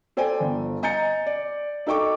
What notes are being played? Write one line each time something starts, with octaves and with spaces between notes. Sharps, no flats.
A4 C5 D5 G5 G#5
G1
D#5 G#5 A#5 G6 A6 C#7
D5
D#4 A4 G5 C#6 D6